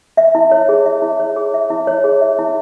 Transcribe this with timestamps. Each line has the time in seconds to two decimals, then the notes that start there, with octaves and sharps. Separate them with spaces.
0.17 E5
0.35 E4
0.52 C#5
0.69 G#4
0.86 E5
1.02 E4
1.20 C#5
1.36 G#4
1.54 E5
1.70 E4
1.87 C#5
2.04 G#4
2.21 E5
2.39 E4